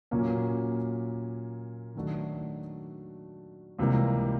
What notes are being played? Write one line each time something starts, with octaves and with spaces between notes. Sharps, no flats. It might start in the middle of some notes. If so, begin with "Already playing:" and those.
A#2 F#3 A#3 C#4
D#3 F#3 A3 D4 F#4
C#2 C3 E3 G3 A#3